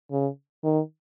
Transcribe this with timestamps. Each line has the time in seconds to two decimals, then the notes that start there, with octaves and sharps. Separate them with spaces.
0.11 C#3
0.64 D#3